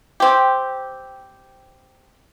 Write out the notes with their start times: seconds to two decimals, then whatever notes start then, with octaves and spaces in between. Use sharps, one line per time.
0.20 C4 G4